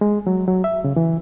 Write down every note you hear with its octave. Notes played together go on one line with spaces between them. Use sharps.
G#3
F#3
F#3
E5
C#3
E3